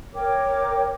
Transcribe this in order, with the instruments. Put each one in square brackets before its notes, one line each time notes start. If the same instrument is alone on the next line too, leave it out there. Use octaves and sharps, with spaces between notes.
[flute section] A#4 C#5 G5 D6